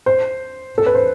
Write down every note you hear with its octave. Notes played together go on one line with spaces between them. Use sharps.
C5
A4
B4
C5